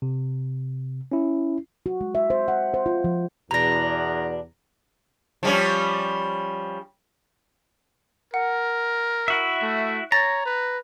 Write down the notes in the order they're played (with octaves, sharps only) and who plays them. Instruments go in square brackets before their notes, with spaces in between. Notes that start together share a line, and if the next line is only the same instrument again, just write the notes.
[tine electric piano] C3
C#4 E4
[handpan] F#4
G#3
E5
C5
F#5
C5
F4
F3
[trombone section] E2 [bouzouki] B2 D4 [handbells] A#5 A#6
[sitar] F3 G3 C#4
[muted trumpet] A#4 [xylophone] F#5
[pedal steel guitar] E4 F#4 E5
[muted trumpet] A3
[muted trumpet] C#5 [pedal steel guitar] A#5 [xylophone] A6
[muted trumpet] B4